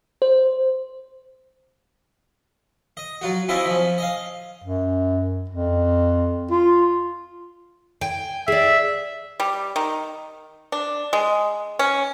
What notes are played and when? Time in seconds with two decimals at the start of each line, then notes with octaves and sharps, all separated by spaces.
0.22 C5
2.97 D#5
3.21 F#3 F4 F#4
3.49 C4 C#4 E4 F4 D#5 E5
3.65 F3 C#4
3.98 D#5 F5
4.64 F#2
5.50 F2
6.51 F4
8.01 G5 G#5
8.48 G#4 D5 E5
9.40 G3
9.76 D#3
10.72 D4
11.13 G#3
11.79 C#4